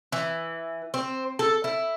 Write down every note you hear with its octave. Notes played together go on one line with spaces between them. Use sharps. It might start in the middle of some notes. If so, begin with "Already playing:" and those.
E3
C4
A4
E4